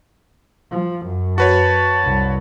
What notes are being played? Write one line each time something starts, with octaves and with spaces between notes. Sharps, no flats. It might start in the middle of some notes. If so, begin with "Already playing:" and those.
F3
F#2
F#4 B4 C#5 A5
C2